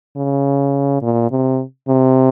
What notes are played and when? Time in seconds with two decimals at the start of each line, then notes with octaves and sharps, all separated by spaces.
0.17 C#3
1.02 A#2
1.31 C3
1.88 C3